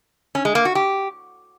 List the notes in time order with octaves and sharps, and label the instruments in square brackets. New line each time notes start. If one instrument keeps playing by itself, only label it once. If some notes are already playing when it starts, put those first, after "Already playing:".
[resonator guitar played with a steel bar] C#4
G#3
A#3
F#4
G4